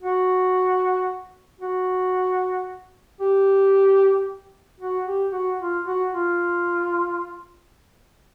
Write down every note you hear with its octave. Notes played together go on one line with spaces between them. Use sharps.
F#4
F#4
G4
F#4
G4
F#4
F4
F#4
F4